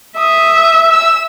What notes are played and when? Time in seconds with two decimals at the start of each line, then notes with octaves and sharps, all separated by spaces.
0.18 E5 D#6
0.90 E6